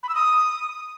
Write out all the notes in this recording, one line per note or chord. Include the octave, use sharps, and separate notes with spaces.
B5
E6
D#6